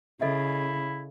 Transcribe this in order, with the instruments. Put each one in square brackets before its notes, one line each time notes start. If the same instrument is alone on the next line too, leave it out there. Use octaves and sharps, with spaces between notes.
[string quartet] C#3 [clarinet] E4 [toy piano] A4 D#5 E5